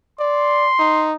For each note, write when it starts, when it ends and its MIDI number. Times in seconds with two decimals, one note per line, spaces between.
0.20 0.69 74
0.20 1.09 84
0.79 1.15 63